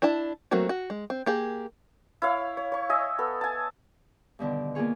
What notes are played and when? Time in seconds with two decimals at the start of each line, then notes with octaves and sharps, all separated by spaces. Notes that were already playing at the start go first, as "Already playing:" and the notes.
0.02 D4 E4 D5 A5
0.51 F#3 A3 A#3 C4 F#4
0.69 F#4
0.90 G#3
1.10 C4
1.26 A#3 G4 G#4
2.22 E4 C#5 F5
2.57 C#5
2.72 C#5 C#6
2.89 D#5 E5 G#5
3.18 B3 A4
3.41 G#5 A5
4.39 G2 B2 D3 D#3
4.75 A#3 B3 F4 G#4 C#5